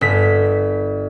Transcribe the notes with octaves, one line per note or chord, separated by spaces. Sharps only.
G1 B6